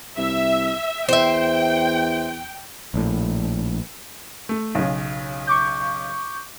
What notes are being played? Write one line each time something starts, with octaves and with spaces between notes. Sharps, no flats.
C2 E5
E2 C5 E5 G5
A#1 A2
A3
B1 C#3
C#6 D6 G6